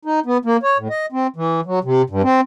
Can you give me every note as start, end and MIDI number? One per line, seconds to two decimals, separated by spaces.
0.05 0.20 63
0.26 0.37 59
0.45 0.57 58
0.63 0.78 73
0.78 0.88 45
0.90 1.06 75
1.12 1.27 60
1.36 1.61 52
1.65 1.79 54
1.84 2.02 48
2.10 2.22 43
2.23 2.41 60